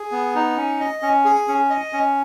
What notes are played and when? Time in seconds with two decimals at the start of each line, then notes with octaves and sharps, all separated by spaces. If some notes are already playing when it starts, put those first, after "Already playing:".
Already playing: G#4
0.12 B3
0.35 D#4
0.57 C#4
0.80 D#5
1.02 C#4
1.25 G#4
1.48 C#4
1.70 D#5
1.93 C#4